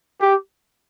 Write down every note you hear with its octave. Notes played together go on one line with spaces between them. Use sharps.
G4